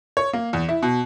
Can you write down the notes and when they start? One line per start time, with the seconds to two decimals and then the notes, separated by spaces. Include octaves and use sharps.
0.17 C#5
0.33 A#3
0.53 E2
0.69 E4
0.82 B2